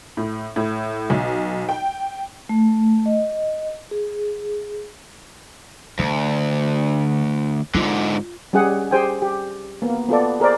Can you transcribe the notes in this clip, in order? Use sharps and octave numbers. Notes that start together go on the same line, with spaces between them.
A2
A2
B1
G5
A3
D#5
G#4
D2 D3
G#2 D3 F4
G3 C#4 G4 G#4 F#5
G4 G#4 C5 G5 G#5
G4
A#3 B3
B3 F4 A4 D5
G#4 A#4 C5 D5